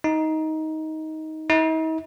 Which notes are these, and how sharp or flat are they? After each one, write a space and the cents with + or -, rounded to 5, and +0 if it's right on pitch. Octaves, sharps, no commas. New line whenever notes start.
D#4 +15
D#4 +45